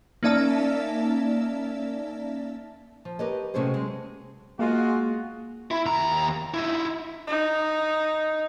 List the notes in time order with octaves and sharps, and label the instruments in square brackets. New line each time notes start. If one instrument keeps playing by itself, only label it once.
[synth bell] A#3 C#4 D#4 D5 E5 A5
[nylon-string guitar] F3
G4 A#4 B4 C#5 D#5
C3 F#3 A3 C#4 G#4 C5
G#3
[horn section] G#3 F4 F#4 [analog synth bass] A#3
[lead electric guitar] E4
D#2 A#5
D#4 E4
[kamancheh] D#4